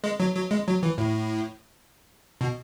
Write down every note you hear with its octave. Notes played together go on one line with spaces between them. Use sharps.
G#3
F#3
F#3
G#3
F#3
E3
A2
B2